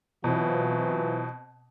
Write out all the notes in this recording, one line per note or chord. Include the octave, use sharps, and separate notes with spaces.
B2 E3 F#3 C4 F4